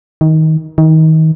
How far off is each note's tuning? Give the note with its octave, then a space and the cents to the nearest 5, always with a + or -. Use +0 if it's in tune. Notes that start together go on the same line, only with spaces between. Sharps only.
D#3 +20
D#3 +30